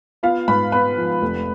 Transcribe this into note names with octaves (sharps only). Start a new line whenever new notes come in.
B3 F4 F5
G#2 B4 B5
B3 B4 B5
F3
F1